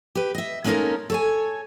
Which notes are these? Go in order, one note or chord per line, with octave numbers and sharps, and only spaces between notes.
G4 B4
D#5 E5
G#3 A#3 C#4 D#4 A4 A#4
A4 C#5 G#5